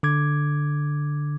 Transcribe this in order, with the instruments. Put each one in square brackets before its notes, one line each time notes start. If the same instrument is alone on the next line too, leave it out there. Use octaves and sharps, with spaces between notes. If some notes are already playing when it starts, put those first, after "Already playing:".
[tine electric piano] D3 D6 G#6